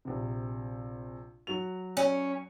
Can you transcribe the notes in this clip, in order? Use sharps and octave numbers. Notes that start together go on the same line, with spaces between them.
A#1 C3
F#3 F#4 F7
C#4